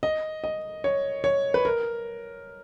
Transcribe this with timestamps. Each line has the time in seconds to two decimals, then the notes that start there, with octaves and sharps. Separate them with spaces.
0.03 D#5
0.44 D#5
0.84 C#5
1.24 C#5
1.54 B4
1.65 A#4